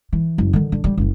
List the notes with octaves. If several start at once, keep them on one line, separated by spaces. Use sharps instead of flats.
E3
F#1
D3 D#3
D3
D3 G3
F#1 F#2